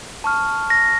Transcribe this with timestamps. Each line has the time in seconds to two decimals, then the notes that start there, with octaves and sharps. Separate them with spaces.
0.24 A5 C#6 F6
0.70 A#6